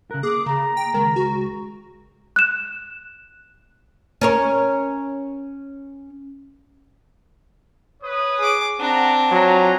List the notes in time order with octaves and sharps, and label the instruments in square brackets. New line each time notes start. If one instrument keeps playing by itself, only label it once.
[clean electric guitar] C#3 A#4 [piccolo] F#6
[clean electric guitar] A#3 [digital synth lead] G#4 [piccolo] D6
[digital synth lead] C#3 [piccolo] A#5
[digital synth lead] G5
[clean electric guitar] C#2 G#3 [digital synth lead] D#3
[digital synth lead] F#4
[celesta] F#6 E7
[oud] C#4 A#4 C#5
[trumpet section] B4 C#5 D#6
[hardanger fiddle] G#4 D6
[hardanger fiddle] C4 D4 [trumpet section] F#5 A#5
[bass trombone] F#3 [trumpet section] F4 G#5 A#5